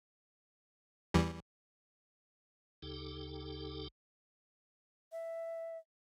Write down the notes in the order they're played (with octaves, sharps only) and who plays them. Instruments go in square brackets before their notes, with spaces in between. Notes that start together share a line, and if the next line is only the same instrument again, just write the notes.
[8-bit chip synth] E2 E3 G3
[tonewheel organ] D2 C#3 D#4 G4 A4 G5
[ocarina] E5